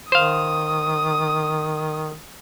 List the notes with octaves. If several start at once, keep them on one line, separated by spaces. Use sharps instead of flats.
D#3 C5 F5 D#6